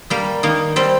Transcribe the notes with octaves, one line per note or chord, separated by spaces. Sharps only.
G3 A#3
D#3 A#3
G3 C4